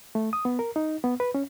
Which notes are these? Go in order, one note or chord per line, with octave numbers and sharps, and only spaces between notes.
A3
D#6
B3
A#4
D#4
B3
B4
C#4